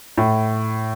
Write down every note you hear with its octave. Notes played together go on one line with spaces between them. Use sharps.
A2